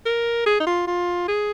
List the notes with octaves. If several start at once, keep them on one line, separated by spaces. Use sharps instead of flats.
A#4
G#4
D#4
F4
F4
G#4